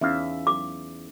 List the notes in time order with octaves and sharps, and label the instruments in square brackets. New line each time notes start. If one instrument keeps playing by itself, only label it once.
[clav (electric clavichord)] E2 F5 [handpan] C#4 D#4 E5
[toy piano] D6